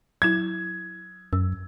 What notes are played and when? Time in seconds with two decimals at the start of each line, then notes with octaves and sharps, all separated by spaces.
0.22 F#3 E4 G#6
1.33 F#2 E6